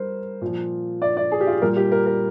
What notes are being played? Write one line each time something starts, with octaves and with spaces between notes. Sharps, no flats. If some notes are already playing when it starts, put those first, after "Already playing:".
Already playing: G3 A#4 C5
A#2 F3
D5
D5
G#4
G4
F4
A#2 G3 A#4
G4
A#4
A#4